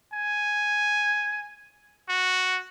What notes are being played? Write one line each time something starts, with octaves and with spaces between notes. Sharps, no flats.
G#5
F#4